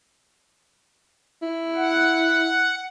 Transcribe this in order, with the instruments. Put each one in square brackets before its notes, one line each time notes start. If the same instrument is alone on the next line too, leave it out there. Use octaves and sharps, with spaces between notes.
[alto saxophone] E4
[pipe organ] F#5